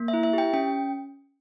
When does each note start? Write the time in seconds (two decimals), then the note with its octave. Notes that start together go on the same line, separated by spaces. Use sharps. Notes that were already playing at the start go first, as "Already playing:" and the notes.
Already playing: A#3
0.08 E5
0.13 E4
0.23 E5
0.33 G4 G5
0.53 C#4 G5